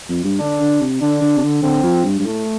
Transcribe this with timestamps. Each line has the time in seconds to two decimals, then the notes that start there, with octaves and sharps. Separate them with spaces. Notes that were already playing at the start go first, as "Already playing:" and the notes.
0.09 F2
0.24 G2
0.40 D3 D4
0.61 D3
0.80 C3
1.01 D3 D4
1.22 D3
1.37 C3
1.43 D3
1.63 D3 C4
1.83 F3
2.04 G2
2.19 G2
2.25 A2 A3